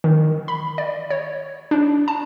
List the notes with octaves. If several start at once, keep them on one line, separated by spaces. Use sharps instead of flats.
D#3
B5
D5
C#5
D4
A5